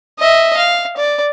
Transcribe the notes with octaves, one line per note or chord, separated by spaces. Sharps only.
D#5 E5
F5
D5